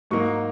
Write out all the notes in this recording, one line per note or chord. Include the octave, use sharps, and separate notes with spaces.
G#2 F#3 A#3 D#4 C#6